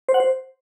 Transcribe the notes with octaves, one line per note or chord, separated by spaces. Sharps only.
C5
F#5
C5